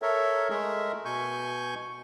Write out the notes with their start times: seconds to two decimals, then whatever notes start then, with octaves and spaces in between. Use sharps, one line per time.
0.02 A4 A#4 C#5 E5
0.50 G#3 A3 G#4 A#4 E5
1.05 B2 G#5 C#6 G6